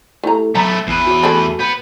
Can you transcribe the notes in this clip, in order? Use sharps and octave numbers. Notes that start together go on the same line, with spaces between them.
A3 E4 G4 A4 A#5
F#3 A3 B3 A#5
G#1 E2 B4
F#4 C#5
A3 G#4 A4
B3 G6 C#7